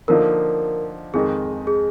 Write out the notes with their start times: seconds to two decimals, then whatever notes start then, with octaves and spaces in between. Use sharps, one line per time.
0.08 D3 F3 A#3 D#4 A#4
1.14 F2 D#3 G#3 D#4 G#4
1.67 G#4